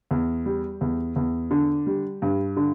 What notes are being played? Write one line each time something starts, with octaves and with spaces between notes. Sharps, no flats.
E2
G3
E2
E2
D3
G3
G2
D3